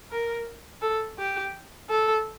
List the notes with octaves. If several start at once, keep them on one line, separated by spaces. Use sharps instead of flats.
A#4
A4
G4
A4